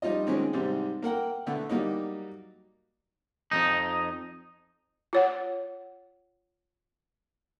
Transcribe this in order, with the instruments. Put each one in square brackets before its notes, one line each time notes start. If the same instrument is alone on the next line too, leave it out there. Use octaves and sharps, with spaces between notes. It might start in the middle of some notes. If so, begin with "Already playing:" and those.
[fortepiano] F3 G3 D#4 F4 D#5
D#3 F#3 G#3 C4 C#4
G#2 C3 G3
A#3 A#4 F#5 G5
B2 D3 A3 B3
F#3 G3 A#3 D#4
[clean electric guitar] F2 G#2 D#4
[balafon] F4 C#5 F#5